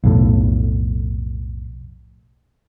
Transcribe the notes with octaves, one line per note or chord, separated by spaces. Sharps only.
B1 F2 A2